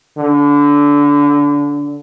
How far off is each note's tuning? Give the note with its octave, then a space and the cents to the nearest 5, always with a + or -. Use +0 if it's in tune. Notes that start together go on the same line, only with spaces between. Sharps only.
D3 -25